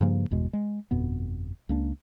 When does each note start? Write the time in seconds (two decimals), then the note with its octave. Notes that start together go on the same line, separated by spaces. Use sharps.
0.01 G2 C#3 F3 A#3
0.31 G1 E2 B2 G#3
0.53 G#3
0.91 G1 F2 B2 B3
1.69 C#2 A#3 D4